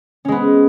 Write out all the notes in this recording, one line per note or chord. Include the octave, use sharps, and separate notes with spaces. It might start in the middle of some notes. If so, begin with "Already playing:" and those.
G#3 B3 C#4